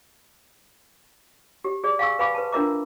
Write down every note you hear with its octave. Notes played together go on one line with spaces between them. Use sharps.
G4
G#4 D5
F5 G#5 C#6 E6
B4 F5 G#5 B5 D6
B4 A5
D4 F4 A#4 E5 A#5 D6